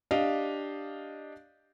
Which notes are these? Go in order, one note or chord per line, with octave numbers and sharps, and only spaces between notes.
D4 G4 D#5 F5